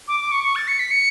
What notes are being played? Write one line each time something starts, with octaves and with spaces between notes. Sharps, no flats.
D6
D6
C#6
C#6
A6
C#7
B6
C#7